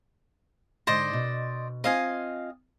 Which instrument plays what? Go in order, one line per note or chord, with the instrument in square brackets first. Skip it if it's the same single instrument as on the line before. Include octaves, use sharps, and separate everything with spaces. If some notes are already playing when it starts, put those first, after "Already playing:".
[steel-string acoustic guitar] G#2 D3 [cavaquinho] C5 D5 D#5
[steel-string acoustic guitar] B2
[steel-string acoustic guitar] C4 F4 [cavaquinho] D#5 F5 G#5